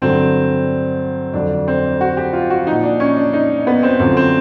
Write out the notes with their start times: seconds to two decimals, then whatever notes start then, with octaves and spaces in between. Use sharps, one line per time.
0.02 G2 D3 F#3 C4
1.33 F2 D3 F#3 D4
1.68 C4
2.01 F#4
2.17 G4
2.33 F4
2.50 F#4
2.67 A#2 F3 D#4
2.84 D4
3.00 C#4
3.17 D4
3.33 D#4
3.67 B3
3.83 C4
3.99 F#2 D3 F3 C4
4.17 C4